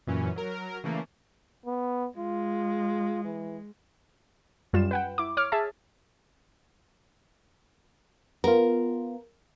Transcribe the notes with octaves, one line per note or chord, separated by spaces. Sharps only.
F#2 A#2 E3 C#4
F#3 A#4
C#3 E3 A3 A#3
B3
G#3 F4
E3
F#2 G3 F4 E7
B4 F#5 G5
E4 D6
C#5 D6 F6
G#4 E5 A5
B3 F4 A#4